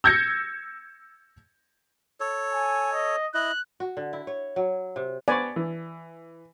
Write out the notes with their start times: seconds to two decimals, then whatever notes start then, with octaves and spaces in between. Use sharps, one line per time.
0.04 E6 G6 G#6 A#6 C#7
2.20 A4 C#5
2.53 G#5
2.93 D#5
3.34 E4 D#5 F#6
3.80 F#4
3.97 D3
4.13 E4
4.27 C#5
4.56 F#3
4.96 C3
5.28 B3 C5 D5 G#5 C#6
5.56 E3